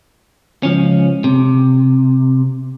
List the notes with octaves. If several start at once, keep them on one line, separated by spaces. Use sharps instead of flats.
C#2 F3 C#4
C3